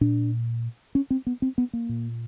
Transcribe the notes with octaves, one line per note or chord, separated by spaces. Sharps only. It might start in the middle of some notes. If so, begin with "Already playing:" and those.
A#2 D4
C#4
C4
B3
C4
B3
A#3
A#2